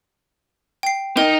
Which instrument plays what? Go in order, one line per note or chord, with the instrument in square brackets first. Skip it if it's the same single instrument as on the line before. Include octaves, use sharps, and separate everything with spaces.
[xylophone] G5 C7
[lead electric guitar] D#4 [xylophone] A#4 G5